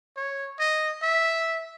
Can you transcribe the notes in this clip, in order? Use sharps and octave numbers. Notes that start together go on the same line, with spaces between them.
C#5
D#5
E5